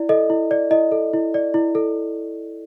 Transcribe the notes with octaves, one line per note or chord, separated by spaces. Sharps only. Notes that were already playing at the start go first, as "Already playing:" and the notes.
Already playing: E4 D5
A4 D#5
E4
D5
E4 D#5
A4
E4
D5
E4
A4